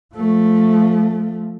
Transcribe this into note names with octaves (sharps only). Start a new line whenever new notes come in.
F3 A3